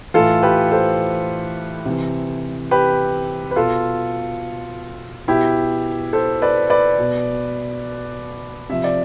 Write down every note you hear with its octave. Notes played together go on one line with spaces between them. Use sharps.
A2 E3 F4 A4
G4 B4
A4 C5
C3 E3
G4 B4
B4
B2 F4 A4
B2 E4 G4
A4 C5
B4 D5
B4 D5
B2
C3 F3 E5
D5